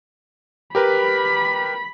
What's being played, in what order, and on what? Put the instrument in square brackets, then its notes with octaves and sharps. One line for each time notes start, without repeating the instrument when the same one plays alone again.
[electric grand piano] G4 A#4 B4 [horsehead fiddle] B5